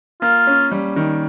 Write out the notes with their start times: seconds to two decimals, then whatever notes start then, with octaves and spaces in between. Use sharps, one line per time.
0.22 A#3 F4
0.47 C#4
0.72 G3
0.96 D#3